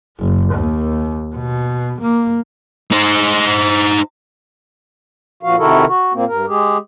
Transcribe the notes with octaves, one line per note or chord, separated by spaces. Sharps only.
F#1
D#2
B2
A#3
D#4 C5
A#2 F3 F#4 F5
C3 D#3 E4 F#4 A4 A#4
F#4
A#2 A#3 C4
G2 A#4
G#3 G4 G#4